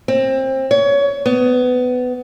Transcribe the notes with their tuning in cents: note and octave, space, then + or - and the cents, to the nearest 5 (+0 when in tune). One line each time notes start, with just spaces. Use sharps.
C4 +25
C#5 +25
B3 +20